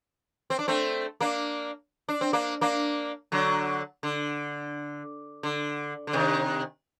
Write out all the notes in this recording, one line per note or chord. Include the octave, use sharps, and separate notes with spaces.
C4
D4
A3 C4
A#3 D4
D4
C4
A#3 D4
A#3 D4
D3 F#3
D3
D3
D3
C3 D#3